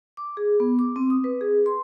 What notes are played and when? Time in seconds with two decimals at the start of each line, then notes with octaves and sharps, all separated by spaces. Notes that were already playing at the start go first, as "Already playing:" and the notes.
0.17 D6
0.37 G#4
0.60 B3
0.79 D6
0.96 C4
1.10 D#6
1.24 B4
1.41 G#4
1.66 C6